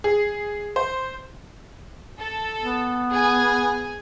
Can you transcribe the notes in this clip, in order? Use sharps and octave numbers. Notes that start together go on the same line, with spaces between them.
G#4
C5
A4
B3
G#4 G#5